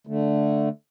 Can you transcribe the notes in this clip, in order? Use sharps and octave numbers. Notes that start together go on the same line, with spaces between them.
D3 A3